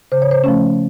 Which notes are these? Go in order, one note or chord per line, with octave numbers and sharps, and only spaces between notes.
C#3 C5
C#5
C5
F3 A3 C#4